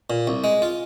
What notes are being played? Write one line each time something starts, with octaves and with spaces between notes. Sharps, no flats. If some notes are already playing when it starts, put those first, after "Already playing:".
A#2
C2
G#3
F4